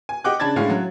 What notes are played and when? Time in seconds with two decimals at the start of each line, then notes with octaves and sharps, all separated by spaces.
0.09 G#5
0.24 G4 D#5 F#5 G5 D6 F#6
0.40 C#3 D4 A5 B5 G#6 A6
0.56 A2 D3 G#3 C#4 F5
0.70 F#3